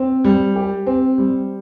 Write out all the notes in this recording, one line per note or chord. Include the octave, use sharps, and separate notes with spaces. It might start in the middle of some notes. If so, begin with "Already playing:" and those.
Already playing: C4
G3
G4
C4
G3